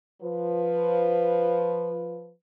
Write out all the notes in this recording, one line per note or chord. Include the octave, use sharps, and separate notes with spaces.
F3 B4